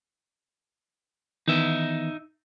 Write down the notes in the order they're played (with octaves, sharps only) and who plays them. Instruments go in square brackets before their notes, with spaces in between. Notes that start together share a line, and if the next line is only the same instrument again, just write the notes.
[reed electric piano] D#3 E3 B3 [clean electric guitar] D#4 E5